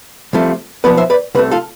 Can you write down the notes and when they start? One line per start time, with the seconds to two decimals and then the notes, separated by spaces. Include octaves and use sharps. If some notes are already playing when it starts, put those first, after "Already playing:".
0.33 C2 C3 F3 A3
0.84 B1 A2 F3 B3 B4 D5
0.97 C5 E5
1.10 B4 D5
1.35 C2 C3 A3 B4
1.51 F4 A4